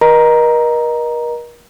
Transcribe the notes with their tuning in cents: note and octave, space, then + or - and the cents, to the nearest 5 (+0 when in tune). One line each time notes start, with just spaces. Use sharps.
A#4 +40 D#5 -15 A#5 +10